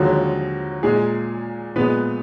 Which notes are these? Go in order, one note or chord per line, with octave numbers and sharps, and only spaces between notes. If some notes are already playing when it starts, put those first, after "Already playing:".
Already playing: D#2 D3 F3 F#3 G#3 F#4
A#2 G#3 G#4
A#2 F3 G#3 B3 B4